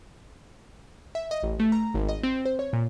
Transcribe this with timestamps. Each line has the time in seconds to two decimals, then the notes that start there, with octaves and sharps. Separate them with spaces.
1.15 E5
1.31 D#5
1.43 A1
1.60 A3
1.72 A#5
1.94 G#1
2.09 D#5
2.23 C4
2.45 C5
2.59 C#5
2.73 A#2